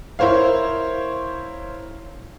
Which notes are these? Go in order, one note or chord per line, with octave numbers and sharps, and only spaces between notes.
E4 A#4 C5 C#5 F5